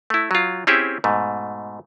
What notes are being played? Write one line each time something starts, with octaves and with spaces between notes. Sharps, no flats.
A3 E4
F#3 F4
C4 C#4 E4 G4 G#4 E5
G#2 B2 A3